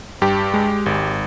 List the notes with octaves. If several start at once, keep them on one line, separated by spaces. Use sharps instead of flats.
G2 G4
G#3
G#1